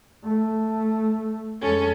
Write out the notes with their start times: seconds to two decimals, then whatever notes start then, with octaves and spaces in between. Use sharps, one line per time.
0.24 A3
1.61 F2 G#3 C#4 A4